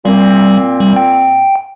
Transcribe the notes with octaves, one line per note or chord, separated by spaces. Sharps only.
A#2 G3 C4
G3
G5